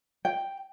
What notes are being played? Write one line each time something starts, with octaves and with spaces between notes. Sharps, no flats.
G5